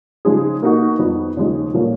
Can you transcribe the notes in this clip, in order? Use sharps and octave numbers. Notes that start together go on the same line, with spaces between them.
C#3 F3 G#3 D#4 G#4
B2 A#3 D#4 F#4
F2 F3 B3 D#4 F#4
D#2 C#3 F3 G#3 D#4
A#2 F3 A#3 C#4